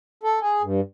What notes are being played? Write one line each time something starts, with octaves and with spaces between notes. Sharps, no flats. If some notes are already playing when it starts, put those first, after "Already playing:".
A4
G#4
G2